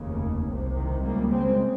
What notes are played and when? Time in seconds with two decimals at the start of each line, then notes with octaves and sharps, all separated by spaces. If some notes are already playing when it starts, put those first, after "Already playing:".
Already playing: F1 D#2 C#3
0.47 C2 C3
0.75 D#3
1.03 C#2 C#3 G3 A#3
1.31 G#3 C4